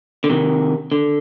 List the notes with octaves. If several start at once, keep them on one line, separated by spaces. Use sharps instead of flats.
D3
C3 D#3
D3